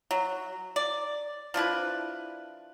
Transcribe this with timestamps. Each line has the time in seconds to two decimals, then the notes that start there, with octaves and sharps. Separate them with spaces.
0.11 F#3
0.76 D5
1.54 F3 D4 E4 B4